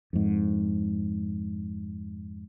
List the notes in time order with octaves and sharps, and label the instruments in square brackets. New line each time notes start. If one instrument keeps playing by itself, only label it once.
[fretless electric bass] F2 G#2